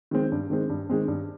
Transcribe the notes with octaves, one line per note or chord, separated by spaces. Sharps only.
D#3 G#3 C4
G2
D#3 G#3 C4
G2
D#3 G#3 C4
G2